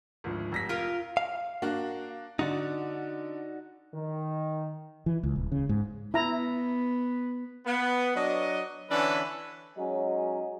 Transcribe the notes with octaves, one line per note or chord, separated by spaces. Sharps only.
G#1 D2 F3
F1 A#6 B6
F4 A#4 F5
F5
A#3 D4 F#4
D3 D#4 F#4 D5
D#3
E3
C#2
D#1
C#3
G#2
B3 E4 A#5
B3
F#3 D4 D#5
D3 E3 C#4 D4 A4 B4
F#3 G#3 C#4 D#4